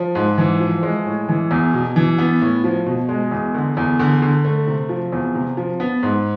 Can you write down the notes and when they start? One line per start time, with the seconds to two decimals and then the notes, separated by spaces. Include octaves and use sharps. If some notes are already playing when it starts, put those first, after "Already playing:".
Already playing: F3
0.15 G#2
0.38 E3
0.60 F3
0.83 G#3
1.05 A2
1.29 E3
1.51 E2
1.73 B2
1.96 E3
2.18 B3
2.41 A2
2.64 F3
2.86 B2
3.09 G#3
3.31 E2
3.54 D3
3.77 E2
3.99 D3
4.22 D3
4.45 A3
4.67 C3
4.89 F3
5.12 E2
5.35 C3
5.57 F3
5.80 B3
6.03 G#2